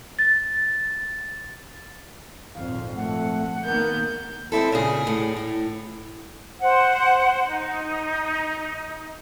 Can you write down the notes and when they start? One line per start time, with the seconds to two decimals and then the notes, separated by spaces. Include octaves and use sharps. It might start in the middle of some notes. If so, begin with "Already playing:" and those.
0.19 A6
2.55 G#1 F2 A#2 F5
2.96 A3 F#5
3.64 D#3 A#3 B3 A#4 G6
4.52 G#3 C4 D#4 E4 A4
4.72 A#2 C#3 G#4
5.07 A2
5.37 A2
6.60 C5 F#5
7.46 D#4